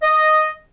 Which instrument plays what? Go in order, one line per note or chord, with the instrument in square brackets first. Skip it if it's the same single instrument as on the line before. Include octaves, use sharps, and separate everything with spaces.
[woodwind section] D#5